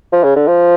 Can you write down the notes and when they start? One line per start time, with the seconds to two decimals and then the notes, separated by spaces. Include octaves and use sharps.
0.13 F3
0.24 C#3
0.36 D3
0.47 F3